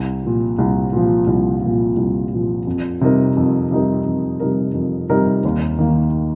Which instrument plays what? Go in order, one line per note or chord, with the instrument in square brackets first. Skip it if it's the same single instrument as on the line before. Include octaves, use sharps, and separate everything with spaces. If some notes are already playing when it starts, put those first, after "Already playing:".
Already playing: [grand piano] C2
A#2 F3
C2
A#2 F3
C2
A#2 F3
C2
A#2 F3
F2
C3 G3 D#4 A#4
F2
C3 G3 D#4 A#4
F2
C3 G3 D#4 A#4
F2
C3 G3 D#4 A#4
D#2
D#3 A#3